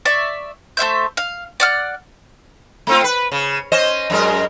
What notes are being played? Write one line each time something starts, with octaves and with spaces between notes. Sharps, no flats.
D5 E5 C#6
A3 C5 E5 G6
F5
D5 F#5 F6
A3 C4 F4
B4
C#3
C#4 C5 D#5
F#2 G#3 A#4